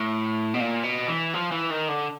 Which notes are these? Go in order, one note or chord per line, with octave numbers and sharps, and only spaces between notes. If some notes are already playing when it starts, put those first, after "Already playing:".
Already playing: A2
B2
A#2
B2
E3
F3
E3
D#3
D3